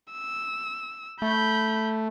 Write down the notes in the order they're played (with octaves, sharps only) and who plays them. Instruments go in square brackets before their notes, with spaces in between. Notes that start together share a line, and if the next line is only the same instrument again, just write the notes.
[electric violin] E6
[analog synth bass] A3 [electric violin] B5 G6